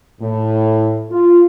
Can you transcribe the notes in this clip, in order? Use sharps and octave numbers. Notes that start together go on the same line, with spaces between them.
A2
F4